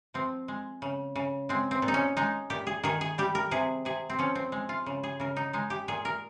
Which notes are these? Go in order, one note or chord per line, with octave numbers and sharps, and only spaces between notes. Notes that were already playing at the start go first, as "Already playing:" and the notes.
F3 C4
G#3
C#3
C#3
G#3 C4
C4
A#2
D#4
C#4
G#3 D#4
A#2 G4
G#4
D#3 G#4
G#4
G3 G4
A#4
C3 G#4
C3 G#4
C4
F3 C#4
C4
G#3
F4
C#3
G#4
C#3 A#4
D#4
G#3 D#4
G4
A#2 G#4
A#4